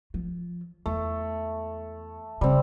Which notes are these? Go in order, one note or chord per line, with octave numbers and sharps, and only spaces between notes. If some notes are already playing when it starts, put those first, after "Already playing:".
F3
E2 A3
C#3 G3 C4